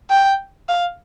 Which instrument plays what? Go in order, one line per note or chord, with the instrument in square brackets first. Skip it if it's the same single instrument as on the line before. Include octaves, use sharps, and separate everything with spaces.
[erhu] G5
F5